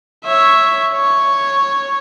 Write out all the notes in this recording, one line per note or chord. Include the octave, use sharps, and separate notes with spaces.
C#5 E5
C#5